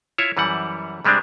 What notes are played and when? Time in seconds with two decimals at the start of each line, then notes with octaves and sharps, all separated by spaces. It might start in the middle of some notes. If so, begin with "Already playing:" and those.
0.18 E4 F4 C#5 E5
0.37 F#2 E3 G3 F#5
1.05 C3 G3 G#3 C4 D4